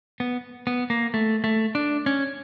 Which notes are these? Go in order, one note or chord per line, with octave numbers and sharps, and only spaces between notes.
B3
B3
A#3
A3
A3
D4
C#4